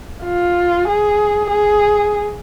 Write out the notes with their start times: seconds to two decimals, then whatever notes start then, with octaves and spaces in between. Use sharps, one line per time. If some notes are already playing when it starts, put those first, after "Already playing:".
0.25 F4
0.88 G#4
1.51 G#4